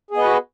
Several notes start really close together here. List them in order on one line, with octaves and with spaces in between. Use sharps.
G#4 B3 D#5 B4 F#4